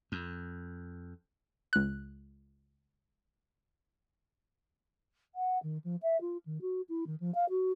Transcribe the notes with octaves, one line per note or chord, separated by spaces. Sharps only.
F2
C#2 F#6
F#5
D#3
F3
E5
F4
D#3
F#4
E4
D#3
F3
F5
F#4